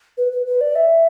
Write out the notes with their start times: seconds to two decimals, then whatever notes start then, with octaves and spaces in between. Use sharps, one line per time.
0.18 B4
0.32 B4
0.46 B4
0.61 D5
0.76 E5